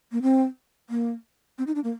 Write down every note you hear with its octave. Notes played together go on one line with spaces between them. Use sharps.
A#3
C4
A#3
C4
D#4
D4
A#3